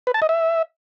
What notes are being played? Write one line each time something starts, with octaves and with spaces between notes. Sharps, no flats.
B4
A5
D#5
E5